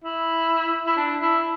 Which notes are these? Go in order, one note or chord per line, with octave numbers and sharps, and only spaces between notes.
E4
E4
D4
E4